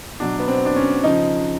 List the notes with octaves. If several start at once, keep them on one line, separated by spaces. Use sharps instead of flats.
B2 F#3 D4
B3
C4
D4
C#4
C#3 F3 D#4